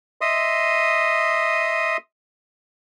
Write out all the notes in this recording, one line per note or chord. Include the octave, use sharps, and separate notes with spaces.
D#5 E5 C6 D#6